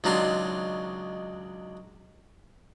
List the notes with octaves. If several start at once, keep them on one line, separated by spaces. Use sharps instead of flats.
C#2 D#3 F#3 D4 C6